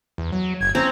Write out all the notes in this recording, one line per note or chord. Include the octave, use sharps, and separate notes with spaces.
E2
F#3
F#1 G#6
C4 C#4 A#5